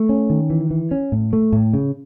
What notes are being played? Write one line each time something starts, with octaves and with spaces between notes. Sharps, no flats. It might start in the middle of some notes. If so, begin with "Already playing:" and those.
Already playing: A3
C#4
D#3
E3
E3
C#4
A2
A3
A2
C#3